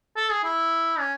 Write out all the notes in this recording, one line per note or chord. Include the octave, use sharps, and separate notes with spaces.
A4
G#4
E4
C#4